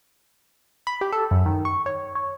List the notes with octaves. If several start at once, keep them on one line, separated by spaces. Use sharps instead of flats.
B5
G4
A4
F#2
D#3
C#6
C#5
C#5